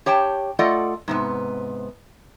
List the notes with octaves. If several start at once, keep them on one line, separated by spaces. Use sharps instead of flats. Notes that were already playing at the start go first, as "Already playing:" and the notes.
G4 C#5 G5 A5
A3 F4 A4 D5 D#5 F#5
G#2 C3 B3